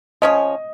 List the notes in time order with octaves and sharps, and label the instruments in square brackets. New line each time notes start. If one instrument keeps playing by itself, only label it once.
[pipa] F3 C#4 G#4 C#5 [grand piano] D#5